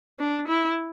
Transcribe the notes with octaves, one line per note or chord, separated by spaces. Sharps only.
D4
E4